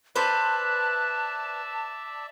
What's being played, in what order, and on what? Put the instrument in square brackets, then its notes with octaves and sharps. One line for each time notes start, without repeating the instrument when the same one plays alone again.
[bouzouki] B4 C5 [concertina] D5 E5 [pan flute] A5 [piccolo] F#6